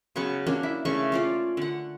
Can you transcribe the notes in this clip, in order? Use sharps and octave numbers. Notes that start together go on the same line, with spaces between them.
C#3 F#3 B3 C#6
A#3 C#4 D4
E4
C#3 A3 A#3 C#6
C#4 F4 D5
D3 F#5